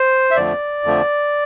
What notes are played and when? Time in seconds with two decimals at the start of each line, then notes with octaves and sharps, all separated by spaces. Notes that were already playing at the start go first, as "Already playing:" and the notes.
Already playing: C5
0.31 E5
0.36 F2 D3 F3 A3 D5
0.84 F2 D3 F3 A3